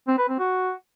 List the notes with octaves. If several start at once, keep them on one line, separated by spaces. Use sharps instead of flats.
C4
B4
C4
F#4